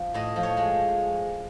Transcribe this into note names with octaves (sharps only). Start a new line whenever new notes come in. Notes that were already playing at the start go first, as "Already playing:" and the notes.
Already playing: F3
A2 D#5
F3
C#5
G#3